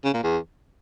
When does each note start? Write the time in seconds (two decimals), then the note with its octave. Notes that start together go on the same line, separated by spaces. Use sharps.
0.04 C#3
0.14 A#2
0.23 E2